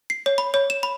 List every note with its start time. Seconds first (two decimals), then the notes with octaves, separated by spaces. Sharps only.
0.10 C7
0.26 C#5
0.38 B5
0.54 C#5
0.70 E7
0.83 B5